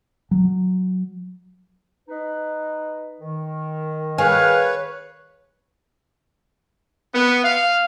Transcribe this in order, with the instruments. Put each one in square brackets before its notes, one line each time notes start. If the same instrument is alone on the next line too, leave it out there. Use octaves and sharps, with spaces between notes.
[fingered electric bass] F#3
[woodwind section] D#4 B4
D#3
[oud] G#4 [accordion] B4 C#5 [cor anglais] F5
[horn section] B3
F5